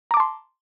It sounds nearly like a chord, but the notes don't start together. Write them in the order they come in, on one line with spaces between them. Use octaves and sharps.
A#5 D6 A5 C6